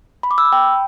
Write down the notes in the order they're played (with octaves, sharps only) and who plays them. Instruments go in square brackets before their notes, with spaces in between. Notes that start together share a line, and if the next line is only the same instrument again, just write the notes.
[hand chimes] B5
D6
E6
B5
G5